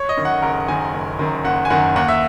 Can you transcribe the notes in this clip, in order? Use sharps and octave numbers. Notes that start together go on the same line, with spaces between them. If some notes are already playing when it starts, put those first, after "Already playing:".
Already playing: C#5
D#5
F#2 D#3
F#5
F#1 A#4
F#2 D#3 G#5
F#1
F#2 D#3
F#1 F#5
G#5
F#2 D#3 F#5
D#2 F#5
E5